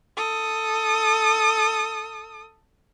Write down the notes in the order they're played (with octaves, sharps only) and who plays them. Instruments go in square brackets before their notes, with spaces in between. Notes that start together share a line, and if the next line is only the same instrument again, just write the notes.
[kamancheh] A4 D#6